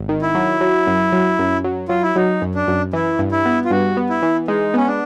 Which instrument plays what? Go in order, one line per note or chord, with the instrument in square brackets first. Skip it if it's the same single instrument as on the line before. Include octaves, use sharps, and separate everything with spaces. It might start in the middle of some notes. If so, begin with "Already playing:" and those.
Already playing: [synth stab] G#1
D#3
[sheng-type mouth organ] E4
[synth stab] F#3
F#3
F#2
F#3
F#2
F#3
[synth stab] F#3 [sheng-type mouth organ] F4
[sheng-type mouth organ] E4
[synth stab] F#3 [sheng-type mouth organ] D#4
[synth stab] F#2
[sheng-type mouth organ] D4
[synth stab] F#2
[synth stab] E3 [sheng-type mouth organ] E4
[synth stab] G2
[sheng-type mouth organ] E4
[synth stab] B3
[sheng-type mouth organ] F4
[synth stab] G2 [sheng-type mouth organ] F#4
[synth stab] B3
[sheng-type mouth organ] E4
[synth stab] E3
[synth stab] G#3 [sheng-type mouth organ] D#4
[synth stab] B3 [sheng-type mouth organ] C#4
[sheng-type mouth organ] D4